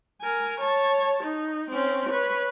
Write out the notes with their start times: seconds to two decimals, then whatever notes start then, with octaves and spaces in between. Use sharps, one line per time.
0.22 A#4 G#5
0.61 C#5 A5
1.23 D#4
1.71 C4 C#4
2.10 B4 C#5